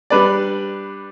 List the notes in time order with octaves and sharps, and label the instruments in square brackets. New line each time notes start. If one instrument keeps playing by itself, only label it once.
[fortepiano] G3 D4 B4 D5